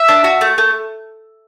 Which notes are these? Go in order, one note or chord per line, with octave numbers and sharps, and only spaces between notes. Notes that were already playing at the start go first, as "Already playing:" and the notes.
Already playing: E5
D4
F#4
A3
A3